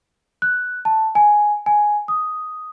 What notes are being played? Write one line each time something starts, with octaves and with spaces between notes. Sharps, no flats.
F#6
A5
G#5
G#5
D#6